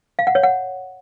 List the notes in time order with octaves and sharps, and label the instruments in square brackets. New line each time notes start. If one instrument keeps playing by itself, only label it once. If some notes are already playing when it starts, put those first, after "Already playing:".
[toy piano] F5
F#5
C#5
F#5